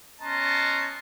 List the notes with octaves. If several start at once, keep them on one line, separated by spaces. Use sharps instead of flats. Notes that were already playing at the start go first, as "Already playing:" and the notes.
B3 C#4 D#5 A5 A#5 C6